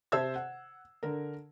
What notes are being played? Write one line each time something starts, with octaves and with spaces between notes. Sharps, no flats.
C3 C5 E5 A5 E6 G#6
F#5
D3 A#4